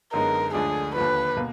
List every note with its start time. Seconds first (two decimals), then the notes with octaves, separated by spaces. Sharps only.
0.13 F#2 D3 G#3 B3 D#4 A#4
0.54 D2 D3 F3 G#3 D4 G#4
0.95 D#2 D3 F3 B4
1.36 B2 A#3